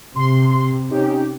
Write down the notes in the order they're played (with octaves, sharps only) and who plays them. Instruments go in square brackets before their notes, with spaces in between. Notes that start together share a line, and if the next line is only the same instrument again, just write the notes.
[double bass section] C3 [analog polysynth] C6
[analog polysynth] C#4 D#4 G4